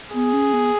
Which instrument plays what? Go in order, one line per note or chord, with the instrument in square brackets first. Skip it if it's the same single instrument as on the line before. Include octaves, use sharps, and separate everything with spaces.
[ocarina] B3 [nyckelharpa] G#4
[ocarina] C#4
B3